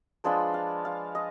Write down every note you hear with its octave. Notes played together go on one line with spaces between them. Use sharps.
F3 G#3 D4 F4 B4
F5
F5
D#5